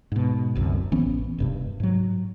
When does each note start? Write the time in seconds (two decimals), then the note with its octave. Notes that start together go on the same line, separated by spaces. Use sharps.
0.12 G#2 B2
0.55 F#1 C2 F#2 D3
0.92 A1 E3 B3 C#4
1.38 E1 G2 C3
1.80 G#2 F#3